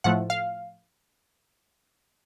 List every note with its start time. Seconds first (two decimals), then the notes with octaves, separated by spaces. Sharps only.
0.04 A2 F3 A3 F#5
0.30 F5